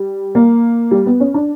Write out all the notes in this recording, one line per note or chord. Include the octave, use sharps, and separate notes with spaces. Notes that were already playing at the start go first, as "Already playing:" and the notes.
Already playing: G3
A#3
G3
B3
C#4
D4